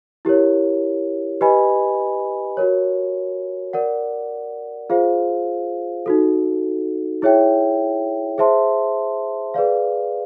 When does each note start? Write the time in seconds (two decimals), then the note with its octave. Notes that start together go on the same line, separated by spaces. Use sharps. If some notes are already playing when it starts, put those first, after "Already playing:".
0.25 E4 G4 A#4 C#5
1.41 G4 B4 D#5 G#5 B5
2.57 F#4 A#4 C#5
3.73 A#4 D5 F#5
4.90 F4 G#4 C5 F5
6.06 D#4 F#4 A4
7.22 E4 G#4 C#5 E5 G5
8.38 G#4 C5 E5 A5 C6
9.54 G#4 B4 D5 F5